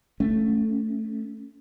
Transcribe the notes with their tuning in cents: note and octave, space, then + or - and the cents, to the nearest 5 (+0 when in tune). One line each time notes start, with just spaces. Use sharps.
A3 +0 C#4 +0